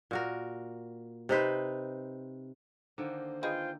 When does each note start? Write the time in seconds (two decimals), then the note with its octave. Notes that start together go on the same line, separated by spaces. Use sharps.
0.11 A#2 F#4 A#4
1.29 C3 D#4 B4 C5
2.98 D3 D#3 A#3 C5
3.43 D#4 F4 G#4 B4 G5